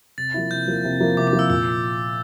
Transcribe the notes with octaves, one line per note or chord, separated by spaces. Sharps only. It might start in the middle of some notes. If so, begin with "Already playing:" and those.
C3 A6
F3 A#3 E4
C3 G6
F3 A#3 E4
C3
F3 A#3 E4
C3 D6
D6
F3 A#3 E4
E6
A#2 E6